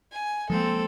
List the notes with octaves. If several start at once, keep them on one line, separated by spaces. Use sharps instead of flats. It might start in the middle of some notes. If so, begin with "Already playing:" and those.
G#5
F3 G#3 A#3 C4 A4